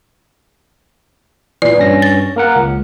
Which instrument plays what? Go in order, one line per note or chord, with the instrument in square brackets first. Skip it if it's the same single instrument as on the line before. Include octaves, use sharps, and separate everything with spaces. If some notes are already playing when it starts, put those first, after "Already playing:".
[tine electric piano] A#2 E3 [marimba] D5
[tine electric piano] G2 C#4 A#6
[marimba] A6
[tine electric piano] A#3 A#4 F#5
C#2